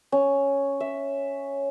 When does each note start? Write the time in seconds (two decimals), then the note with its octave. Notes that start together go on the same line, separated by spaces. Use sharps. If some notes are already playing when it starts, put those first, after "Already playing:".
0.12 C#4
0.80 E5